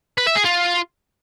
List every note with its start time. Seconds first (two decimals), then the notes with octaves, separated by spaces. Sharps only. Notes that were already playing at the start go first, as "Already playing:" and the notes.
0.18 B4
0.27 E5
0.36 G#4
0.45 F4